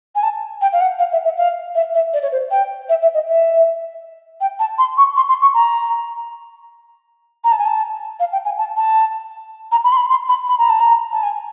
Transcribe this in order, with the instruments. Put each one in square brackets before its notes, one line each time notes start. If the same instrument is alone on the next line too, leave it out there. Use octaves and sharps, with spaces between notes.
[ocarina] G#5
A5
G5
F5
F#5
F5
E5
E5
F5
E5
E5
D5
C#5
C5
G5
E5
E5
D#5
E5
G5
A5
C6
C#6
C6
C6
C#6
A#5
A#5
A5
G#5
A5
F5
G5
G#5
A5
A5
A#5
B5
C6
B5
C6
B5
B5
A#5
A5
A#5
A5
G#5